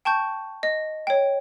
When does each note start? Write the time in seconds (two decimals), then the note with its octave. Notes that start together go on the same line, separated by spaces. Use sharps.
0.05 G5 A5 C#6 G6
0.63 D#5
1.07 C#5 G5